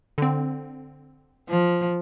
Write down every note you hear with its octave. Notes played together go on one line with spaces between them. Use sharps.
D3 C4
F3